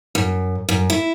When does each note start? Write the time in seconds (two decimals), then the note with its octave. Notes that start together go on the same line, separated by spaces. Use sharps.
0.15 F#2
0.69 F#2
0.90 E4